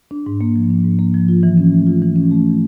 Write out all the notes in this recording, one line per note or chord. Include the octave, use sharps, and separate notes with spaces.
D4
G#2
A#3
F3
D4
G#2
A#3
F3
F4
E3
C#4
A3
F4
E3
C#4
A3